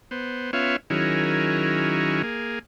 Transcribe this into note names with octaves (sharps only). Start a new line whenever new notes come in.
B3 C5
B3 C#4 F4 C#5 E5 F5
D#3 F#3 C#4 E4 G#4 A#4
A#3 G#4